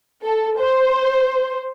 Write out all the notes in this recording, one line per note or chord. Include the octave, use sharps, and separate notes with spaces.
A4
C5